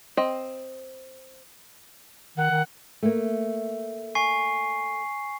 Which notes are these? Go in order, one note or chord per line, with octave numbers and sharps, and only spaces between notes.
C4 D#5
D#3 F#5
D#3
A3 A#3
G#5 C#6 C7